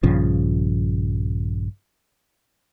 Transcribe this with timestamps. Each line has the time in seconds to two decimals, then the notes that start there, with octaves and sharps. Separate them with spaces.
0.03 A#1 G2 C#3 F3